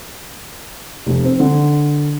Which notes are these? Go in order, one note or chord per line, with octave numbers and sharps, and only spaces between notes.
F1
C4
D3